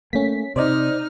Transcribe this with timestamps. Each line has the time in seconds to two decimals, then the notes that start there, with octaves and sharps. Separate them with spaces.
0.13 A3 A#3 C#4 B6
0.56 C3 D#4 C5 D5 D#5 F6